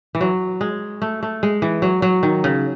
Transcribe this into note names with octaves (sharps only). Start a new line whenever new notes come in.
E3
F#3
G#3
A3
A3
G#3
E3
F#3
F#3
D#3
C#3